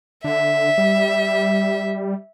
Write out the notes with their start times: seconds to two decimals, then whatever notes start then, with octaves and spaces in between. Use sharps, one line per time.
0.24 D3 E5
0.78 G3